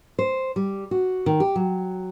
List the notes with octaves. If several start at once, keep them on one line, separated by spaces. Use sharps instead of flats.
C5
G3
F#4
D#3
G4
F#3